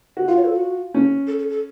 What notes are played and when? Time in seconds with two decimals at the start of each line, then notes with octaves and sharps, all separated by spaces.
0.17 F#4
0.28 F4 F5
0.37 C#5
0.45 A4
0.53 F#4
0.94 C#4
1.27 A4
1.39 A4
1.50 A4